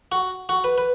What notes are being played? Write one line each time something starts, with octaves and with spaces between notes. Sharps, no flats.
F#4
F#4
B4
B4